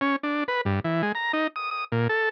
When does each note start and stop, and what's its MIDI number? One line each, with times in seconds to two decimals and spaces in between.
0.01 0.16 61
0.23 0.44 62
0.48 0.61 71
0.65 0.80 43
0.84 1.02 52
1.03 1.12 56
1.15 1.32 82
1.33 1.47 63
1.56 1.71 87
1.71 1.84 87
1.92 2.08 46
2.09 2.29 69